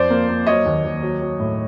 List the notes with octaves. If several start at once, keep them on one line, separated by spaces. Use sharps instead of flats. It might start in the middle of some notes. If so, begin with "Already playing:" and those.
Already playing: F2 F3 C5 D5
A#3
A#3
F#3 C#5 D#5
D#2
D#2
F#3
F#3
A2